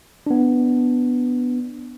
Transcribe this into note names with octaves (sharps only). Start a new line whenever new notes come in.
B3 D4